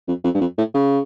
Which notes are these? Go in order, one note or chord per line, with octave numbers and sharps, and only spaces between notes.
F2
F2
G2
F2
A2
C#3